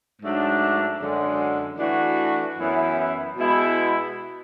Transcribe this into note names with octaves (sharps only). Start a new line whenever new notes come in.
G#2 F#3 A3 D4
F#2 D3 G#3
E3 A3 D4 F#4
F#2 E3 B3 E4
B2 G#3 B3 E4